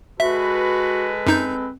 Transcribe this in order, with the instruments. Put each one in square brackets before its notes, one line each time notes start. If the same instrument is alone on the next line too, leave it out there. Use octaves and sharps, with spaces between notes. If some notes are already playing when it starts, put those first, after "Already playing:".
[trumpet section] G#3 A4 B4 [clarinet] F#4 [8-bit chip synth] E5
[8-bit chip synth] F#2 D#4 G6 [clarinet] C4